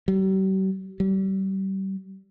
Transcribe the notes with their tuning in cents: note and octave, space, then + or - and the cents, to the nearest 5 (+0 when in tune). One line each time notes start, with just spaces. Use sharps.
G3 -45
G3 -30